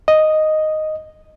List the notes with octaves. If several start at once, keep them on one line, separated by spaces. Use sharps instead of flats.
D#5